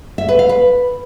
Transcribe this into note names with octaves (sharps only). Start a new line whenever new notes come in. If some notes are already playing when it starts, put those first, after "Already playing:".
E5
B4
F5
B4